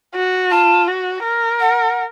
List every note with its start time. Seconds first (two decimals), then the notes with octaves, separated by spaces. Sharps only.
0.15 F#4
0.51 F4 A5
0.87 F#4
1.24 A#4
1.60 F#5